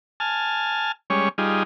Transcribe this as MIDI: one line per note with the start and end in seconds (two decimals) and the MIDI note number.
0.20 0.92 80
0.20 0.92 81
0.20 0.92 89
1.10 1.29 55
1.10 1.29 56
1.10 1.29 61
1.10 1.29 73
1.38 1.63 55
1.38 1.63 63
1.38 1.63 65
1.38 1.63 68